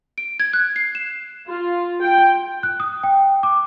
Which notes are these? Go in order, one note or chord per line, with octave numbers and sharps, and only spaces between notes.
D7
G#6
F#6
C7
E7
F4
G5
F#6
D#6
G5
D6